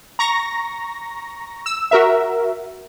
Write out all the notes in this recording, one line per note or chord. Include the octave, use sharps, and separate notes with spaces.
A#5 C#6 A#6
E6
F#4 A#4 E5